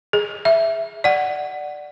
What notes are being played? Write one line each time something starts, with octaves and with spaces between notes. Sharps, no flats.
G#4
E5
D5 F#5